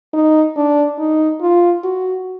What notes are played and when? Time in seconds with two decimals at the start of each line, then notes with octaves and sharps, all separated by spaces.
0.14 D#4
0.56 D4
0.99 D#4
1.41 F4
1.84 F#4